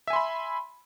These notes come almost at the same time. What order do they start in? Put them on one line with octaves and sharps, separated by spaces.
E5 G#5 C6 B5